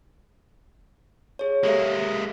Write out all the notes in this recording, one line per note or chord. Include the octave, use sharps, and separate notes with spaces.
G#4 C#5
G#3 A#3 G4 A4 E5